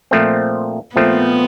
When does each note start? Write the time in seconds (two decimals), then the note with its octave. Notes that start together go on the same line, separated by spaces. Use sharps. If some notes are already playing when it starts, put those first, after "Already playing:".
0.11 A#2 F3 A3 C4
0.96 A#2 F3 A3 B3 C4